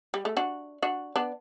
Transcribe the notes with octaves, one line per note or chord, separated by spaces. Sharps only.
G3
A3
D4 F#4
D4 F#4
B3 D4